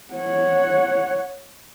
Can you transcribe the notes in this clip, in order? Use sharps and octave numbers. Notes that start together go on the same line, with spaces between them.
C#5 F#5